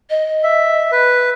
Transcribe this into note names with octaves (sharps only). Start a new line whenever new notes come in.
D#5
E5
B4